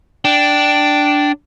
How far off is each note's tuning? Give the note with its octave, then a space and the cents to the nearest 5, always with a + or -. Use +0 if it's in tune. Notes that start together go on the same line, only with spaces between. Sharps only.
D4 +0 G5 -10